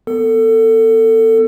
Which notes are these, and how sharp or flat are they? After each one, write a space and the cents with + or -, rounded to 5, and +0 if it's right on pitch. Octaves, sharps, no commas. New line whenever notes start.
B3 +0 A4 +25